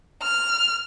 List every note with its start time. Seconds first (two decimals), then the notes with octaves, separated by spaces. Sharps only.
0.22 F6